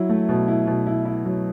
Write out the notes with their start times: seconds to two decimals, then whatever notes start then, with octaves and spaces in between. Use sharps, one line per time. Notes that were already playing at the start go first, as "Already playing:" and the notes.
Already playing: F#3 E4
0.09 A3
0.29 B2
0.48 E4
0.67 B2
0.87 E4
1.05 E4
1.25 F#3